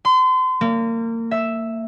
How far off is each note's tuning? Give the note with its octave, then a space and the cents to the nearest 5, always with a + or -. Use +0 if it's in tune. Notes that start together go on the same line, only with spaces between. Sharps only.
C6 -35
A#3 -30
E5 +0